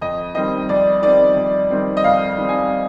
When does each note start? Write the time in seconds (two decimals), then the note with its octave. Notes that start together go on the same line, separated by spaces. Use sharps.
0.01 F2 D#5
0.35 D#3 G3 C4 D#5
0.69 F2 D5
1.02 D#3 G3 C4 D5
1.36 F2
1.70 D#3 G3 C4
1.97 D#5
2.04 F2 F5
2.38 D#3 G3 C4
2.49 G#5